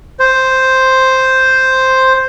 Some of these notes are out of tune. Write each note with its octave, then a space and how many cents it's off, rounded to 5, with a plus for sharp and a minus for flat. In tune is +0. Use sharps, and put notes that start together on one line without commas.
C5 +0